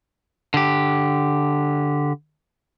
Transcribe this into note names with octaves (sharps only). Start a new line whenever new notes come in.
D3 G4